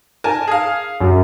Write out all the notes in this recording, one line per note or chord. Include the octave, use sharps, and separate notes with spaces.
A#4 G#5 A5
G#4 F5
F#2